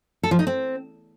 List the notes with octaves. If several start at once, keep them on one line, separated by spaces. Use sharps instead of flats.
A4
F3
D#4
C4